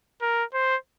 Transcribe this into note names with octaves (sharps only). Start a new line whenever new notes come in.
A#4
C5